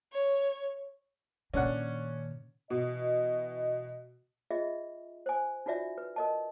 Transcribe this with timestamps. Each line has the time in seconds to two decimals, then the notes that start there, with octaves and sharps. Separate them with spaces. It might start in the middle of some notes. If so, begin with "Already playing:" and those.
0.12 C#5
1.54 A#2 D#3 C#4 D4 F#5
2.70 B2 E3 F#4 D#5
4.51 F4 G#4 D#5 E5
5.26 C5 G#5
5.66 D#4 F4 F#4 D5 E5
5.98 B4
6.16 A#4 D#5 A5